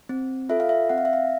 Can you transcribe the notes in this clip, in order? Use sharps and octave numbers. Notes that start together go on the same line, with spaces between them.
C4
F4 A4 E5
F5
E5
C4 F#5
F5
E5
F5